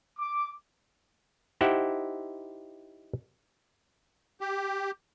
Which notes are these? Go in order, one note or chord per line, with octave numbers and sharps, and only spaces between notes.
D6
D#4 E4 G4 C5 E5 F#5
G4